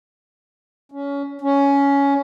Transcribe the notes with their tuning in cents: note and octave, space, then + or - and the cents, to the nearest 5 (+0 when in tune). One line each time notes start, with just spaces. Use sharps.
C#4 +25
C#4 +15